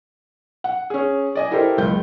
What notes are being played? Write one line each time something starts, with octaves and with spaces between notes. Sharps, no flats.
F#5
C#4 G#4
D5 D#5 G#5
E4 G4 A4 A#4 C5
F#1 C#2 G6